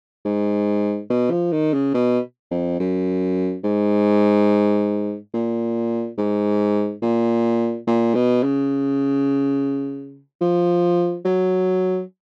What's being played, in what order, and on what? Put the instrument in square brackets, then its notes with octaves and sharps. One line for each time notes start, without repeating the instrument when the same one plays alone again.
[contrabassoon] G#2
B2
F3
D#3
C#3
B2
F2
F#2
G#2
A#2
G#2
A#2
A#2
B2
C#3
F3
F#3